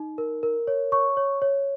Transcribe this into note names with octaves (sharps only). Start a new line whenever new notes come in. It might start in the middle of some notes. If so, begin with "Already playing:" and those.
Already playing: D#4
A#4
A#4
C#5
C#5 C#6
C#5
C#5